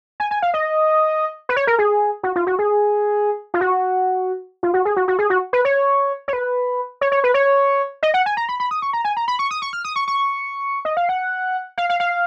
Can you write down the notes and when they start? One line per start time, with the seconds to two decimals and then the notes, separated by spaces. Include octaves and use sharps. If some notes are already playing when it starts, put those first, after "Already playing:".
0.20 G#5
0.31 G#5
0.42 F5
0.54 D#5
1.49 B4
1.56 C#5
1.67 A#4
1.79 G#4
2.23 F#4
2.36 F4
2.47 F#4
2.59 G#4
3.54 F4
3.61 F#4
4.63 F4
4.74 F#4
4.85 G#4
4.96 F#4
5.08 F#4
5.19 G#4
5.30 F#4
5.53 B4
5.65 C#5
6.28 C#5
6.33 B4
7.01 C#5
7.12 C#5
7.24 B4
7.34 C#5
8.03 D#5
8.14 F#5
8.26 G#5
8.37 A#5
8.49 B5
8.60 B5
8.71 D#6
8.82 C#6
8.93 A#5
9.05 G#5
9.17 A#5
9.28 B5
9.39 C#6
9.51 D#6
9.62 C#6
9.73 F6
9.85 D#6
9.96 C#6
10.08 C#6
10.85 D#5
10.97 F5
11.09 F#5
11.78 F5
11.90 F5
12.00 F5